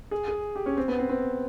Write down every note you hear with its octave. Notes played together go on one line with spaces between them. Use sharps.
G#4
G#4
G4
C#4
C4
B3
C4
C4